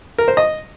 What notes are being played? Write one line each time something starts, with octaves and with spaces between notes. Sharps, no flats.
A#4
C5
D#5